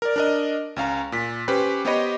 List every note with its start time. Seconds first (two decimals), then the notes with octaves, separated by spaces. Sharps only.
0.02 A#4 D5
0.16 D4 A#4 D#5
0.76 C#2 C#4 F5 A#5
1.12 A#2 B6
1.48 C#4 G4 B4 C5 B5
1.85 B3 G4 C5 C#5 D#5 B5